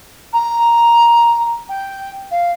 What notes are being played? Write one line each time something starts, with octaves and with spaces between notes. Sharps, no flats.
A#5
G5
F5